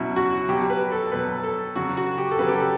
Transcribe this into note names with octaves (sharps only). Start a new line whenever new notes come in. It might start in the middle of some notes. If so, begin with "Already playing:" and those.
Already playing: B2 F#3 C#4 E4
F#4
B2 F#3 G4
B4
A4
B2 F#3 B4
A4
C#3 F#3 F#4
F#4
G4
A4
C#3 F#3 B4
G4
A4